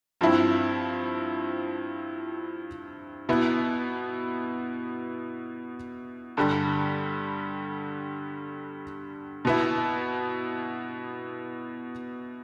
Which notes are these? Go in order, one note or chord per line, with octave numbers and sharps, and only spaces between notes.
G2 F3 C4 E4
B2 B3 E4
G2 D3 G3
B2 B3 E4